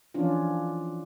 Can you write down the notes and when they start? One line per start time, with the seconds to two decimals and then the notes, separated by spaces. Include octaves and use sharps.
0.14 E3 F3 C#4 D4 F4